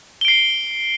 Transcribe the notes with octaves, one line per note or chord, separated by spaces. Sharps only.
C7 D7 G7